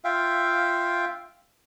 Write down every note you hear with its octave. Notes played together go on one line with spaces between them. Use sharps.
F4 E5 F5 G5